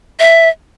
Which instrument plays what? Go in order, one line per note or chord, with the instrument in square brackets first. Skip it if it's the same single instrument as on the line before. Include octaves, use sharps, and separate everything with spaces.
[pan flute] E5